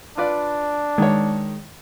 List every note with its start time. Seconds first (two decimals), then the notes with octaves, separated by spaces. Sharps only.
0.18 D4 F4 B4 D5
0.98 D#3 G#3 C#5